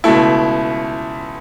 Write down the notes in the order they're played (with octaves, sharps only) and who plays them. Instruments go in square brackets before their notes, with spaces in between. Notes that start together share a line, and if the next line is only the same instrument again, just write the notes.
[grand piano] C#2 B2 A3 E4